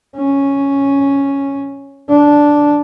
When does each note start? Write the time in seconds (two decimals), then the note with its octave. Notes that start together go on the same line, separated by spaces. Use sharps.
0.17 C#4
2.10 D4